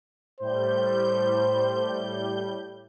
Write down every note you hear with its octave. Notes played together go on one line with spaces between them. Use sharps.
A2 G3 C5 G6